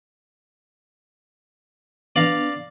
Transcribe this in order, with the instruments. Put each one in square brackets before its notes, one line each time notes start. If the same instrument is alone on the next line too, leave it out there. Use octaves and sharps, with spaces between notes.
[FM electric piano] B3 D4 [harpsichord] D5 F5 A#5